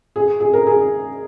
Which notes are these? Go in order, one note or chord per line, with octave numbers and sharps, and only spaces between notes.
G#4
G#4
A#4
G#4